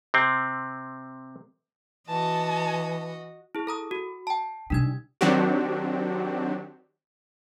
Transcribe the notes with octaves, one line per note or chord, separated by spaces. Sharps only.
C3 C4
E3 F#4 D#5 A5
E4 G#4
A4 A#5 D#6
F#4
G5 A5
C3 G3 D4 D#4 G#6
D#3 F#3 C4 D4 F#4 G4